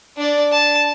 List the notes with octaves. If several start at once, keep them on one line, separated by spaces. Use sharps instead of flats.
D4 D5
A5